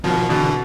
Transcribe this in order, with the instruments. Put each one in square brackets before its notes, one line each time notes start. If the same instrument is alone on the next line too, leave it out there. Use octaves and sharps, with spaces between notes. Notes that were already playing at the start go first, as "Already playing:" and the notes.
[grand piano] B2 [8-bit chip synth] D#3 F3
[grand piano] B2 [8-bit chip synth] D3 E3